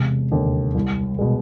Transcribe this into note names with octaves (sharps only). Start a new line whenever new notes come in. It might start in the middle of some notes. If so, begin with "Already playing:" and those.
Already playing: E1 C3
D#2 D3
C2
B2 G#3